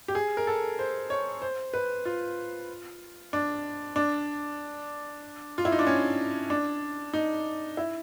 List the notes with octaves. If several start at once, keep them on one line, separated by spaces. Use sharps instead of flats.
G4
G#4
A#4
A4
C5
C#5
C5
B4
F4
D4
D4
F4
E4
D#4
D4
C#4
D4
D#4
E4